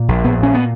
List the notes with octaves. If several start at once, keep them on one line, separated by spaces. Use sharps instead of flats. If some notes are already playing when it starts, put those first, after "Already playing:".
Already playing: A#2
A#1
A#1 B3
A#2 C#4
B3